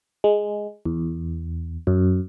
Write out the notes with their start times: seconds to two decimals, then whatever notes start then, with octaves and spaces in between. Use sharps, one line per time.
0.24 G#3
0.85 E2
1.87 F#2